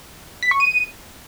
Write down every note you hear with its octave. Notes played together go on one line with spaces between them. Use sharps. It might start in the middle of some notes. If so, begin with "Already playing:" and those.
B6
C#6
D#7